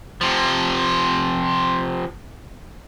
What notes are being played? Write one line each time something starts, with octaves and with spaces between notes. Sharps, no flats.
C3 F3